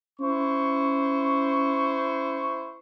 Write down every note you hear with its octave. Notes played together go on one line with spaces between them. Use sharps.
C#4 E4 C5 C#6